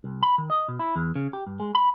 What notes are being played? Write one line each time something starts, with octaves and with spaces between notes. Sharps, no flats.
C2
B5
D#3
D#5
B2
E4
E2
C#3
G4
G2
G#3
B5